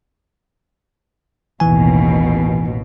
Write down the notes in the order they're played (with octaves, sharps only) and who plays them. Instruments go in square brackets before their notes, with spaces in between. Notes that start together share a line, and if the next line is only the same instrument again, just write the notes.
[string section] A1 D#2 B2 [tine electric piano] E3 G#5